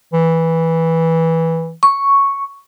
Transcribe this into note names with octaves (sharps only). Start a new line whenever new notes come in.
E3
C#6